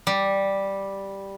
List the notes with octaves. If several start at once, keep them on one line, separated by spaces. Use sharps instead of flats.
G3